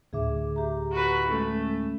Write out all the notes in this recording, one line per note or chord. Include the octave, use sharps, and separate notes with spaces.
D2 A2 D3 G#4 E5 D6
G4 A#5
F#4 B4
G#3 A3 C#4